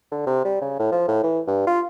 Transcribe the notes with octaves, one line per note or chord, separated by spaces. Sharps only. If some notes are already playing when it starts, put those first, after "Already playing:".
D3
C3
G3
C#3
A2
F3
A2
E3
G2
F4